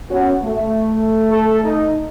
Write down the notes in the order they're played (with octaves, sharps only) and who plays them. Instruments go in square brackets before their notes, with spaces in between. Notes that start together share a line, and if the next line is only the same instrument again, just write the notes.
[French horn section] B3 C#4 F#4
A3
[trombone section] A4
D#4